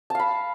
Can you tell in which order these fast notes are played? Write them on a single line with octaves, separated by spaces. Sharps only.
A5 F5 B5